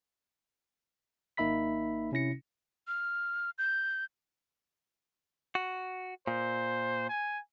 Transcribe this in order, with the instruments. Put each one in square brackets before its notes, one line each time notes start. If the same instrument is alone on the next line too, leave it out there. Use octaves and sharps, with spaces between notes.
[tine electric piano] G#1 A#3 D#4 E5 B5 B6
C3 C#4 E4 A#6 C#7
[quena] F6
G6
[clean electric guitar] F#4
[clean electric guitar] A#2 [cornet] C5
[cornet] G#5